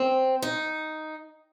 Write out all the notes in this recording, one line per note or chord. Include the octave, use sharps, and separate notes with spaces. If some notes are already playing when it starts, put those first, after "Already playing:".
Already playing: C4
D#4